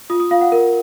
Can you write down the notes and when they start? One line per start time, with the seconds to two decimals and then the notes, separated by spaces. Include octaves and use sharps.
0.10 F4 D#6
0.20 D#6
0.31 F4 F5
0.41 F#5
0.52 A#4